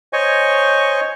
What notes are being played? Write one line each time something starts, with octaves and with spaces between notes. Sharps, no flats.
C5 C#5 D#5 G#5 C#6